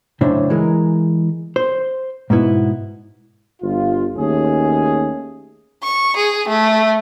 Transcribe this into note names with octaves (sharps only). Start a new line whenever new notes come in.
F#2 A2 C#3 D4 C5 E5
E3 G#3 A#4
C5
G#2 B2 B3 E4
G1 F4
D#2 A3 C#4 G#4
C#6
G#4
A3